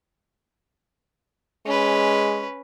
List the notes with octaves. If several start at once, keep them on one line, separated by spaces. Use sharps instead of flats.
G#3 C#4 B4